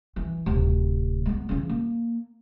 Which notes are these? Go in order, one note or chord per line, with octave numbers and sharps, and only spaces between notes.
E3
D1 C3
G#3 B3
C#3 E3
A#3